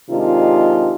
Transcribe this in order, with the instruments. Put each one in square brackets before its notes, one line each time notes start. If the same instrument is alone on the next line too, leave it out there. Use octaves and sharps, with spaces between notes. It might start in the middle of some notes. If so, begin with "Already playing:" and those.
[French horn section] C3 D#3 G#3 D4 D#4 F4